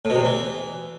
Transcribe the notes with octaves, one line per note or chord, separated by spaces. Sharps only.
A2
B2
C3
E2
E3